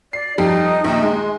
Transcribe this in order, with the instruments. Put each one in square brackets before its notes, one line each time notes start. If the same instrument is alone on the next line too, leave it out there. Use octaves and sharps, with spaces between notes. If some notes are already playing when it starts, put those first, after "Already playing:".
[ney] D5 [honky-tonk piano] C7
[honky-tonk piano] F2 G3 [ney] D#4
[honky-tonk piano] A#1 D#2
G#3